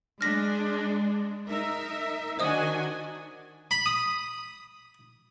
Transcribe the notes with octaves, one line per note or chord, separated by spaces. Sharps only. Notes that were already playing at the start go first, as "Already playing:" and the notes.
G#3 D4 G#4 F6 A#6 B6
D#4 A#4 E5
D#3 D4 F#4 C5 D#5 G#5 D#6
B5
D#6